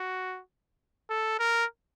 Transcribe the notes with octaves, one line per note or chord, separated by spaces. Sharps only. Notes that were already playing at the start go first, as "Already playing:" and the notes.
Already playing: F#4
A4
A#4